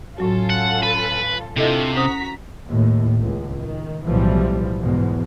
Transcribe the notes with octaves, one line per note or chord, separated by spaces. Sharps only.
A2 F#3 C#4 F4 F#4 A4
F#5
B4
C3 A3 D4 E4 F4 A4 D#5
C#4 F#4 C5 A#5 D#6 B6
D#2 A2
C#2 A2
D#3
B1 A2 E3 F3 G3
E2 G#2 B2